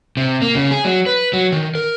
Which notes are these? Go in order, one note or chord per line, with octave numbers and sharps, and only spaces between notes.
C3
A#3
C#3
G#4
F#3
B4
F#3
D#3
A#4